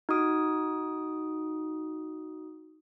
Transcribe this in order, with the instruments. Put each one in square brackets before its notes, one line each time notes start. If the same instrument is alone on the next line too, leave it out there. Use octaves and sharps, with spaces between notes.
[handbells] D#4 F#4 D#6 D7